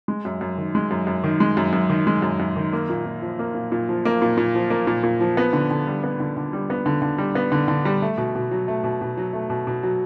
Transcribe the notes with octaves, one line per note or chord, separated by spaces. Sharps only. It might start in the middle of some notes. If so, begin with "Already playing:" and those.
G#3
F#2
F#2
D#3
G#3
F#2
F#2
D#3
G#3
F#2
F#2
D#3
G#3
F#2
F#2
D#3
A#3
A#2
A#2
F3
A#3
A#2
A#2
F3
A#3
A#2
A#2
F3
A#3
A#2
A#2
F3
B3
D3
D3
G3
B3
D3
D3
G3
B3
D3
D3
G3
B3
D3
D3
G3
A3
B2
B2
F#3
A3
B2
B2
F#3
A3
B2
B2
F#3